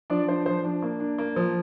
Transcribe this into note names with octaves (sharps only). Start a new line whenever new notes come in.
F3 D4 D5
D4 C5
F3 C5
D4
A#3
D4
A#3
F3